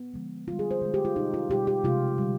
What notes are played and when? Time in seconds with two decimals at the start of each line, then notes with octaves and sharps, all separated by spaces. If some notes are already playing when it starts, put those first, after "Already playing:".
Already playing: B3
0.14 D3 F3 G#3
0.48 D3 G3 F4
0.59 G#4
0.71 C5
0.82 D3 G#3
0.94 G4
1.05 F4
1.16 B2 G3 D#4
1.34 F4
1.50 B2 G3 G4
1.67 G4
1.84 C3 F3 G#3 F4
2.18 D3 G3